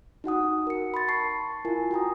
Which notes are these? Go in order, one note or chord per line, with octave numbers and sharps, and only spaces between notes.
D#4 F#4 F#5 D#6
A#4 C#7
B5 C6 A6
A5 C#6 C7
E4 F4 A#4 G#5
F#4 G5 A#5 D#6